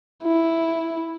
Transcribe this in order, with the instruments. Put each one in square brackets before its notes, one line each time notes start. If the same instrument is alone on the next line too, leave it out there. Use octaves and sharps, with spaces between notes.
[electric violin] E4